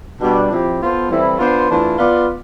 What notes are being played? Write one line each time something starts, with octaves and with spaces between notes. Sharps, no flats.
B2 G3 D4
F3 C4 E4 G4
B3 F4 A4 C5
E3 G3 C4 E4 A4
B3 D4 F4 C5
E3 A3 D4 F4
B3 F4 B4 D5